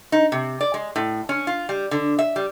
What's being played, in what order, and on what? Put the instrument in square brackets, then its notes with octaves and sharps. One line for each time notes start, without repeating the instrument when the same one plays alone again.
[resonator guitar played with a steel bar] D#4
C3
D5
G#3
A2
C#4
F4
G3
D3
E5
G3